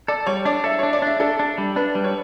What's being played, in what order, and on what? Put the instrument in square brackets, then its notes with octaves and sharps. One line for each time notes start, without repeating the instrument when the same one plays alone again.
[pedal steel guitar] A4 [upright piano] D5
[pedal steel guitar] G3 [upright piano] C#5
[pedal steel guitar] D4 [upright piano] D5
[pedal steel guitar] A4 [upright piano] E5
[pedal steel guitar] D4 [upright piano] C#5
[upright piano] D5
[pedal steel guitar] D4 [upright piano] E5
[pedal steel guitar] D4 [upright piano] A4
[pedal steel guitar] D4
G3
[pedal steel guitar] D4 [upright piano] B4
[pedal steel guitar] G3
[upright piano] C#5